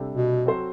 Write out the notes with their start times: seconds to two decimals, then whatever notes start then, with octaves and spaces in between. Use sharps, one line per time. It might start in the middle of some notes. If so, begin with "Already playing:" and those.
Already playing: C3 G3 D4 A4
0.15 B2
0.45 F#3 C4 F#4 A4 C5